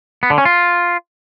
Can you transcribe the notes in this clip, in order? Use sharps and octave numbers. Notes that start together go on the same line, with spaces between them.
B3
D3
C#4
F4